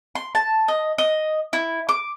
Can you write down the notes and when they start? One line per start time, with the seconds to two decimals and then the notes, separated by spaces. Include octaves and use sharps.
0.15 C6
0.35 A5
0.68 D#5
0.98 D#5
1.53 E4
1.89 D6